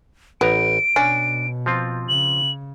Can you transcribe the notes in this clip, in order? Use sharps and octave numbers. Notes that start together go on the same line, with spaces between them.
A1 B3 A#5 D7
B2 C#4 D4
F3 C4 F4
C#3 F#7